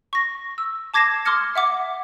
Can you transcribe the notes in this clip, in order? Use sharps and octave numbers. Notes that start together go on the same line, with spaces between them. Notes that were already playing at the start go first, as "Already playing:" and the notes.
C#6 A#6
E6
A5 D6 G#6 A#6 C7 E7
C6 D6 D#6 F6 G#6 C#7
E5 F#5 D6